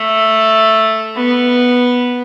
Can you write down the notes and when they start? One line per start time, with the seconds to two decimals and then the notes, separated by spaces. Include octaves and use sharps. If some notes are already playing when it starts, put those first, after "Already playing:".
Already playing: A3
1.16 B3